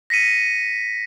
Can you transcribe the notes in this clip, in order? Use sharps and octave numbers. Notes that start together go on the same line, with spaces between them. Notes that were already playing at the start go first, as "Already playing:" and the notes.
A#6 B6 C#7 D#7